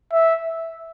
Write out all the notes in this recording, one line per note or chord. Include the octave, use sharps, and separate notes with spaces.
E5